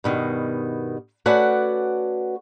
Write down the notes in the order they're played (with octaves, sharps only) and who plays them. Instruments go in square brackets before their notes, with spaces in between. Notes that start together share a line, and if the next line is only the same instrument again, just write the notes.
[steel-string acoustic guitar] G2 B2 D#3
A3 C#4 F#4 B4 D5 F#5